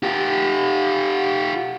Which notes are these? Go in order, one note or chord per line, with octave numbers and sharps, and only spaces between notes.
F4 G4